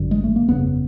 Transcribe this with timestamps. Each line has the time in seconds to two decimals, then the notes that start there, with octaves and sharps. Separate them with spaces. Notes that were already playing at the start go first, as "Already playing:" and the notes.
Already playing: G#1 F#2 D3
0.11 G#3
0.24 A3
0.36 A#3
0.48 G1 F2 C#3 B3